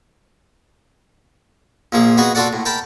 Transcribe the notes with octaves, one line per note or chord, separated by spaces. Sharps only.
A#1 F3 A#3 G#4
B3 F#4 G#4 D#5
D4 F4 F#4 A4 D5 F#5
A2
A#4 G5 A5 B5